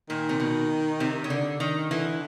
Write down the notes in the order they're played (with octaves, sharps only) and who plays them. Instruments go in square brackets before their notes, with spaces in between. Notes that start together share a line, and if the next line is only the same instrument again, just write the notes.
[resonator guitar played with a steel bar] A#2 [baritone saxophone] D#3
[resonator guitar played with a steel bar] C3
B2
C3
C#3
D3
D#3
[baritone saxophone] D3 [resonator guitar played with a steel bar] E3